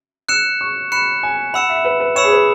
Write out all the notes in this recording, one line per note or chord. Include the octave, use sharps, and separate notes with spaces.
E6 F#6 C#7 E7
C#6
B5 F#6 C#7 E7
G#5
F#5 B5 E6 C#7 E7
E5
B4
B4
C#5 B5 E6 C#7 E7
G#4
B4